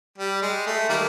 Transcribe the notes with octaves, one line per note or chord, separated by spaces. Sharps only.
G3
G#3
A3
D#3 G3 A#3